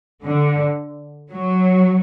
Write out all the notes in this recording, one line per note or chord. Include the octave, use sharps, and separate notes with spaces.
D3
F#3